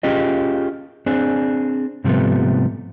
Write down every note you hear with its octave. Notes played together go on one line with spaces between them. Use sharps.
C#4 F4 G4 G#4 D#5
C4 D4 G#4
G#2 C3 F3 G3 A3 B3